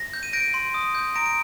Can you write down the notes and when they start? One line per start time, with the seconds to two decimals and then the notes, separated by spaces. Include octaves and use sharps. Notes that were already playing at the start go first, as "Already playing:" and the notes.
Already playing: A#6
0.13 G6
0.23 D#7
0.33 G6 A#6 D7
0.54 C6
0.74 D#6
0.95 G6
1.15 A#5 A#6 D7
1.26 D7